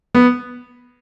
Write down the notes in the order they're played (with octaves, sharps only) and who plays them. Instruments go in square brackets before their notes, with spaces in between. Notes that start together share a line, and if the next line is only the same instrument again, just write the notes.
[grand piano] B3